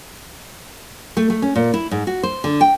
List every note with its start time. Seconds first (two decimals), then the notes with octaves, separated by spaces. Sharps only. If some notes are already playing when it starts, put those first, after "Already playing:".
1.17 A3
1.30 A3
1.42 C#4
1.56 A#2
1.74 E4
1.91 G#2
2.07 F#4
2.23 C5
2.44 D3
2.61 G5